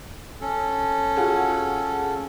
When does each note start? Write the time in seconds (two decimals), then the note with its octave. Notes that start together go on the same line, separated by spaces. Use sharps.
0.41 C#4 A4
1.17 F4 F#4 G#4